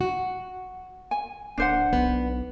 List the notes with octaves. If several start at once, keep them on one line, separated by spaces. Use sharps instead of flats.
F#4
G#5
D1 D4 C5 F#5
B1 B3